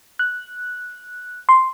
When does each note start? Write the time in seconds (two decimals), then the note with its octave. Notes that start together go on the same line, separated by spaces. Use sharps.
0.19 F#6
1.49 C6